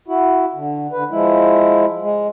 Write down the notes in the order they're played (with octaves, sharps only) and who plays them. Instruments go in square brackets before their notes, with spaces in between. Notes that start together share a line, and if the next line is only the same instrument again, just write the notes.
[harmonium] E4 F#4
D3
D3 B4
F3 G#3 E4
G#3